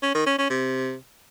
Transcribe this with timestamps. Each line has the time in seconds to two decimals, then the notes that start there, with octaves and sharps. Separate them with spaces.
0.03 C#4
0.15 D#3
0.26 C#4
0.38 C#4
0.50 C3